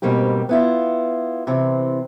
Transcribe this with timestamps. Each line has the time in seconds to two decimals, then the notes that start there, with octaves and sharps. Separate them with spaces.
0.02 G#2 B2 G3 A#3 C4 G4
0.49 B3 E4 F4
1.47 C3 E3 C4